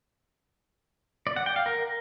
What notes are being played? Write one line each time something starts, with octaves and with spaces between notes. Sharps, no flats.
D5
F#5
G5
F5
A#4